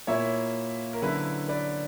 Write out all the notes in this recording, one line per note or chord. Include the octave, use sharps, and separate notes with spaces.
A#2 A#3 E4 C#5 E5
A#4
D3 F#3 C#4 E4 B4
B4 D5